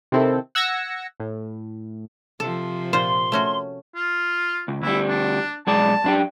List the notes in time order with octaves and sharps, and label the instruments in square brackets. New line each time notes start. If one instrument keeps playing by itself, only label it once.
[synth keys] C3 D#3 C4 E4 A4
F#5 E6 G#6 A#6 C#7
A2
[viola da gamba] C3 F3 [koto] A4
[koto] A#2 F4 C5 [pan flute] C6
[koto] A3 C#4 F#4
[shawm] F4
[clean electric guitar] C#2
[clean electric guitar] D2 G3 [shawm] E4
[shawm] D4
[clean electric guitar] B1 G#3 D5 [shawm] A5
[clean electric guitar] F#2 D4 G4